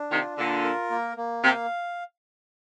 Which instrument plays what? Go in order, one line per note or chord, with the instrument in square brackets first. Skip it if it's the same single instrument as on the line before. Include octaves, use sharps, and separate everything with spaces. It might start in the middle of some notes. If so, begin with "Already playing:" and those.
Already playing: [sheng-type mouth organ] D4
[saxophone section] C3 D#3 [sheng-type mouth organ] F4
[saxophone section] A#2 D3 [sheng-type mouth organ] F4
[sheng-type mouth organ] A#4
A#3
A#3
[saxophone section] C3 [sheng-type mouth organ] F5